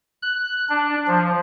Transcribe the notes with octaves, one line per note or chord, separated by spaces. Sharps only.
F#6
D4
F3